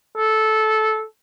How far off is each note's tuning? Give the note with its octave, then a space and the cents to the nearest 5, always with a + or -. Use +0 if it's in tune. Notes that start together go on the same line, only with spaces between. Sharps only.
A4 -15